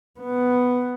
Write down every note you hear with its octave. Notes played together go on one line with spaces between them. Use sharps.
B3